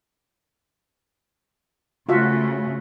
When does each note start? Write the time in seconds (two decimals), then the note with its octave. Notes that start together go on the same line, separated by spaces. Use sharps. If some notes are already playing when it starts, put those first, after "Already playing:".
2.09 C#3 A3 F4 F#4 E5